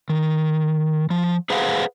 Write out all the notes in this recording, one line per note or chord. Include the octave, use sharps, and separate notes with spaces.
D#3
F3
G#4 B4 C5 F5 F#5